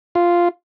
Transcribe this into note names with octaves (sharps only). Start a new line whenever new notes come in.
F4